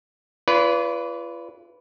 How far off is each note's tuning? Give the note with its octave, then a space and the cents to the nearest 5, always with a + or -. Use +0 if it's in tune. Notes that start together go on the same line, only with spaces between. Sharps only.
F4 -35 B4 +0 D5 -35